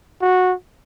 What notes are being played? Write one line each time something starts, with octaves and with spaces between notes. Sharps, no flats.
F#4